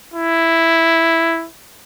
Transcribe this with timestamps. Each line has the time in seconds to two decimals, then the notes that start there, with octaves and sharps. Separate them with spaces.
0.14 E4